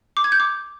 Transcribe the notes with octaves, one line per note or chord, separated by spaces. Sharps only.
D6
G#6
G6
D6